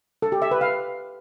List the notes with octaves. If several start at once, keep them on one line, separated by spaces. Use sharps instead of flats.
A4
G4
E5
B4
F5